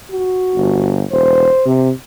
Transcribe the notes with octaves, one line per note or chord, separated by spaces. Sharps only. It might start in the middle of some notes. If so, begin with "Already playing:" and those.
F#4
G1
E1 C5
C3